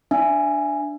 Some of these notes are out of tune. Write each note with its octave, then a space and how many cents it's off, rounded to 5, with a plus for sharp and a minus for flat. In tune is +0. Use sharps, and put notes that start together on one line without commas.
D4 +0 E5 +30 G#5 +0